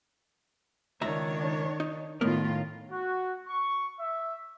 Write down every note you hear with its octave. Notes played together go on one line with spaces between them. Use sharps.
C#2 D#3 D4 C#5 E5 A#5
D#4
A2 D#3 A3 B3 F4 A#4
F#4
C#6
E5